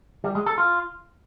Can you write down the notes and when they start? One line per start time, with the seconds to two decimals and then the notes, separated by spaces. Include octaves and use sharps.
0.24 G3
0.35 G#3
0.46 A4
0.58 F4